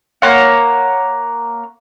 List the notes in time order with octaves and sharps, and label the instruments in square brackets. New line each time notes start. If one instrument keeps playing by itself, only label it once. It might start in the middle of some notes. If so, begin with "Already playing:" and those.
[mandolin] A#3 C#5 F#5